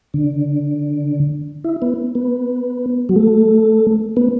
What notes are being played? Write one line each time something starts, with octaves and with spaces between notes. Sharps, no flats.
D3
E4
B3
B3
F#3
A3
B3